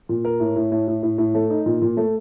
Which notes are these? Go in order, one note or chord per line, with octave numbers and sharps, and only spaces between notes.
A#2
A#4
A2
A2
A2
A2
A2
A2
A3
D#4
A#2
A#2
A3